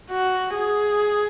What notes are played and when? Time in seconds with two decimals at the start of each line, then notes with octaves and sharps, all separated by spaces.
0.11 F#4
0.55 G#4